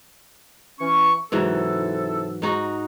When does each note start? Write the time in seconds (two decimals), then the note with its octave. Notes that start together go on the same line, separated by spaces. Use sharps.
0.79 E3 C#4 C#6
1.32 G#2 C3 E3 F#3 E4 A4
2.42 G#2 D#4 F#4